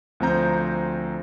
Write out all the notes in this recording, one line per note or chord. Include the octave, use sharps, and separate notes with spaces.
D2 F3 C4 A#5 G6